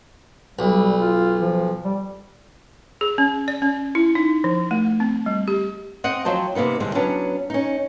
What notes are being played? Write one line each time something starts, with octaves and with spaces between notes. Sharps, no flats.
B1 G3
F4
F3
G3
G#4
C#4
D5
C#4
E4
D#4
F3
A3
C4
G3
G4
C4 D#5 F#5 G5
F3 F#3 C5 G5 A5
C3 A#3 B3 D#4
E2 D3 G3 G#3 C4
F#3 B3 C#4 D4
C#4 D#4